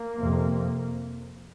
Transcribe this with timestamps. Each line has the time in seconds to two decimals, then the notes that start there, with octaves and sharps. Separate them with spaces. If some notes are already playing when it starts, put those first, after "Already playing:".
Already playing: A#3
0.21 F2 C3